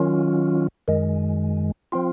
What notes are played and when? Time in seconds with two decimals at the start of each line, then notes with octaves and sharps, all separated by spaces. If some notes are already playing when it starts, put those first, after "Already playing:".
Already playing: D#3 F#3 C#4 F4
0.88 F#2 D#3 G#3
1.92 F3 C4 F4